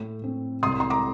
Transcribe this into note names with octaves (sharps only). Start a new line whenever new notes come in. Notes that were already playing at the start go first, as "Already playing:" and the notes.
Already playing: A2
A3 C4
C2 C6 D#6
C6
A#5 D6